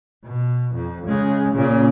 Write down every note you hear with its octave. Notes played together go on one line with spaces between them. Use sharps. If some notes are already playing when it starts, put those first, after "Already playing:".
B2
F2
C#3 G#3
A#2 C#3